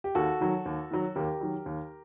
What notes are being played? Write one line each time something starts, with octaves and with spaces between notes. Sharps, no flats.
G4
D#2 F#4 A4
D#3 F#3
D#2
D#3 F#3
D#2 G4 A#4
D#3 F#3
D#2